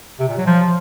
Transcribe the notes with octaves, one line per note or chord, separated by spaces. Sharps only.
C3
A#2
F#3
F3